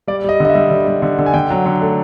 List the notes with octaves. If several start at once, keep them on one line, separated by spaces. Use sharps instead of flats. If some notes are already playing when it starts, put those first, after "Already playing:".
G3 D5
G3 D#5
D3 D#5
E5
G3
D3
G3
D3
D3
G#5
D3 G5
F#3
D3
A3